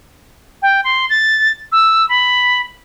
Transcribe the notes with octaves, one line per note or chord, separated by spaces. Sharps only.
G5
C6
A6
E6
B5